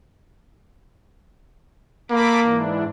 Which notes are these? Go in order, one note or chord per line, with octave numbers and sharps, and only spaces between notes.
A#3 A4 B5 D6
G#2 E3 D4